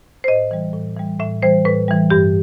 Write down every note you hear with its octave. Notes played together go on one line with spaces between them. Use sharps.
C5
A2 D#5
E3 G3
A2
E3 G3
A2 E5
E3 G3 C5
A2 B4
E3 G3
G2 G4